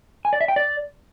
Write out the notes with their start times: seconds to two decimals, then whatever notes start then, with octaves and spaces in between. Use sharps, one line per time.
0.25 G#5
0.33 D5
0.41 E5
0.48 G5
0.56 D5